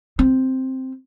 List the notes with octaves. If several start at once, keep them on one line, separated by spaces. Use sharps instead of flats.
C4